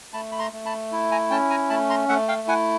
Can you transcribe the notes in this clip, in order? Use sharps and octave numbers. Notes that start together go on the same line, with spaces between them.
A3 A5 B5
B5
A#5 C6
A3
A5 B5
E4
G#5 A#5
C#4 G5 A5
G#5 A#5
A3 A5 B5
A#5 C6
A3 E5 F#5
F5 G5
E4 F#5 G#5